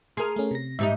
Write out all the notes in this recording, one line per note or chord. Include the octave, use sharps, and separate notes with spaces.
G#4 A#4 C6 D#6
A3 C#4
C3 A#6
G#2 G3 D#4 E5